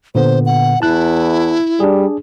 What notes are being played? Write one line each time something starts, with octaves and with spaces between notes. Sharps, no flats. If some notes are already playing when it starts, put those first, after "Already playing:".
A#2 D3 B3 C5
F#5
E2 E4 A5 F#6
G3 D4 G#4